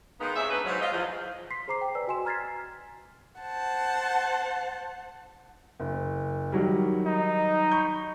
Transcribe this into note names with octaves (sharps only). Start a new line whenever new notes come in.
D#3 G#3 A#3 B3 D#4
C3 G#4 C#5 E5
D2 C#3 D#4 B4
G#2 F#3
F4 D#5
E2 F3
C6 B6 C7
G#4 C5 A#5 D6 C7
G5
B4 D5 G#5 E6
F#4 D#5 G#5 C6 E7
A#5 F6 G#6 A6 B6 C7
C5 F#5 A5
F#1
D#3 F#3 G3
D#4
B5 C#6 G6